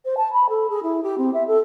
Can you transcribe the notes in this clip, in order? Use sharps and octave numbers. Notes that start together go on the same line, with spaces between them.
C5
A5
B5
A4
G#4
E4
G4
C4
E5
A4